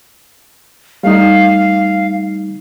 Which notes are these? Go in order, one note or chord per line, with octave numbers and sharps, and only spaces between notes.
G3 A3 D#4 F5